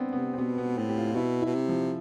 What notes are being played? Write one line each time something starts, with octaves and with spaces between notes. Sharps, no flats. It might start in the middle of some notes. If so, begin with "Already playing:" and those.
Already playing: B3 C4 D4
C3 B3
C4
B2 B3
B3
A2 C4
G4
F4
F4
B2 E4
B2 E4
C3
F3